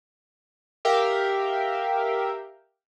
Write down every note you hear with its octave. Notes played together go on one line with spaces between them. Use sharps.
G4 A#4 E5 F5 G5